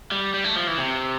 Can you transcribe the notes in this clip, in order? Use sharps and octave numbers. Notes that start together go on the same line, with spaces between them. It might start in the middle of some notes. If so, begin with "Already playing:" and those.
G3
G3
A3
F3
E3
C3